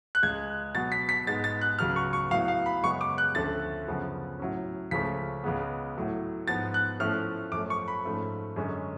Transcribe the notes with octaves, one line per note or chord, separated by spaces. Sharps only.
F#6
C#2 C#3 G#3 G#6
B2 F#3 B3 A6
B6
B6
G#2 G#3 B3 A6
A6
F#6
C#2 C#3 F#3 B3 F6
C#6
C#6
A2 F#3 B3 F5
F5
B5
F#2 C#3 G#3 B3 C#6
D6
F#6
D2 D3 F3 A3 C#4 A6
F#2 C#3 F3 B3
A2 F#3 C#4
C#2 C#3 F3 A3 C#4 B6
C#2 C#3 G#3 B3
A2 F#3 A3
G#2 F3 B3 A6
F#6
A2 F3 A3 C#4 F6
F#2 F3 A3 D6
C#6
B5
G#2 F3 A3 C#4
F#2 D3 G#3 C#4